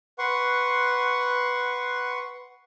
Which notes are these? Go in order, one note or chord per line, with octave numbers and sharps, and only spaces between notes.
B4 F#5 C6 C#6